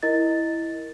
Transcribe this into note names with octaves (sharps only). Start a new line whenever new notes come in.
E4 A#4 D#5 A6